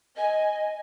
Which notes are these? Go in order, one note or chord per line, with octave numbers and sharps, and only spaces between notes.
D#5 G#5